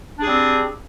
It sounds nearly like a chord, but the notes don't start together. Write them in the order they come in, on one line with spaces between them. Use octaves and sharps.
D4 G#4 G3 C4